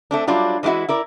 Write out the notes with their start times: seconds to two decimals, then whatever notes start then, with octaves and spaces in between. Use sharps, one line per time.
0.11 A3 C4 D4
0.27 F#3 G3 D4 F4
0.63 E3 G#3 A3 E4 F#4
0.89 E4 A#4 D5